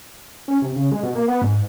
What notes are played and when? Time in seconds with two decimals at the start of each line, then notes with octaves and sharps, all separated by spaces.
0.48 C#4
0.62 C3
0.76 C#3
0.92 G#3
1.03 B2
1.15 A#3
1.28 B3
1.42 G#2